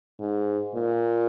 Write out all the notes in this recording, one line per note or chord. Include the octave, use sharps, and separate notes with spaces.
G#2
A#2